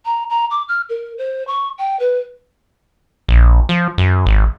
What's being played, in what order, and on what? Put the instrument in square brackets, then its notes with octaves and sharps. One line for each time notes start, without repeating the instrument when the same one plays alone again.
[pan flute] A#5
A#5
D6
F6
A#4
C5
C#6
G5
B4
[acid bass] A#1
F3
F#2
G#1